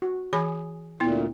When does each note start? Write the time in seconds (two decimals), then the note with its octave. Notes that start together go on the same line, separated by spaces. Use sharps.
0.02 F#4
0.33 E3 G#4 B5
1.00 D2 A#2 B3 E4